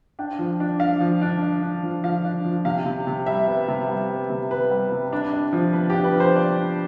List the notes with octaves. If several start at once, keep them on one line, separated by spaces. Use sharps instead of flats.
D4 G5
F3
D4
D4 F5
F3
D4
D4
D4
F3
F3 F5
D4
F3
C3 F5
C3
C3
G3 E5
B3
C3
G3
B3
C3
B3 B4
G3
C3
D4
D4
F3
B3 B4
D4 G4
B4
F3 C5
B3 D5
D4